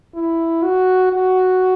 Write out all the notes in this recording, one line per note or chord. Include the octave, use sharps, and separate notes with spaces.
E4
F#4
F#4